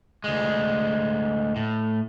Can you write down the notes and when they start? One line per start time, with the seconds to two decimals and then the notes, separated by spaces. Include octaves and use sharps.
0.24 D2 G#3
1.56 A2